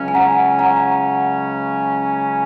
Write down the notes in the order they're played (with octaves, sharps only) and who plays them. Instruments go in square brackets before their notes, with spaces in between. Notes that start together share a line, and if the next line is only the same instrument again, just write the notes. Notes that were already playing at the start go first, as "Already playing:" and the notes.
Already playing: [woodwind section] C#2 C#3 F#3 C#4
[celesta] G#5
F#5 A#5
F#5 A#5